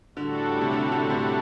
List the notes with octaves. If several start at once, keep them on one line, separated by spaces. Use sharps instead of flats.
A2 D3 G3 D4 F#4 A4
C3
D3
D3
C3